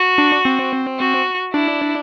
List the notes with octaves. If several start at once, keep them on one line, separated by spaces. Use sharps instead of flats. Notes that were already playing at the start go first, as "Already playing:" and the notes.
Already playing: F#4
D4
C4
F#4
D4 E4